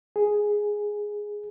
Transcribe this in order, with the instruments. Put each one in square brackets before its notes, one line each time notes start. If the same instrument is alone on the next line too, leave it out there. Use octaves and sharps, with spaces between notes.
[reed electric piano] G#4